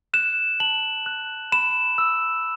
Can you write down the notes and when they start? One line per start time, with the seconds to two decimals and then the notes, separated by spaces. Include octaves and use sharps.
0.14 F#6 E7
0.60 A5 F#7
1.06 F#6
1.52 B5 E7
1.98 E6